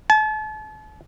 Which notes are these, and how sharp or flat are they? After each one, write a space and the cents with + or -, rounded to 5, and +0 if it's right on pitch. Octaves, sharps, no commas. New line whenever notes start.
A5 -40